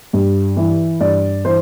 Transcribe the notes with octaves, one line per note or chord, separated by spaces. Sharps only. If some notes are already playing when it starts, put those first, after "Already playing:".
G2
E3
G2 D5
E3 C5